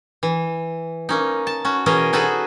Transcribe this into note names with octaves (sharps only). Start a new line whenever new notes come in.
E3
A#3 C#4 D#4
A5
C#4 F#4
B2 E3 C#4 G#4 A#4 D#5
C#4 D#4 F#4 G#4 A4 B4